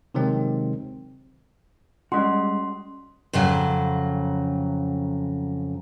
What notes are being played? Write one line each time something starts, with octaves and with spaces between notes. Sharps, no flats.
C3 D#3 F#3 G#3 C4
G3 G#3 C#4 F#4 C6
F2 C#3 F#3